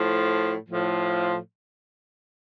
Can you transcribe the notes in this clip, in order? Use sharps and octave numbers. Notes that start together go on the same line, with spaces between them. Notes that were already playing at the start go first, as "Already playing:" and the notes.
Already playing: A2 F3
A2 F3